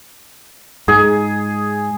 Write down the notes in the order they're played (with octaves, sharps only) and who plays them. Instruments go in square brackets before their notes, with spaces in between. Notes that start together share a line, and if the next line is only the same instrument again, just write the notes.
[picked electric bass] G#2 [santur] G#4